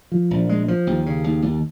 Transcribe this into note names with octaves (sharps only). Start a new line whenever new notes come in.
F3
A#1
G#3
F3
D#2
C#3
D#2
D#2